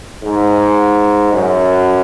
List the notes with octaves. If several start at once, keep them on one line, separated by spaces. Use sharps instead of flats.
G#2
F#2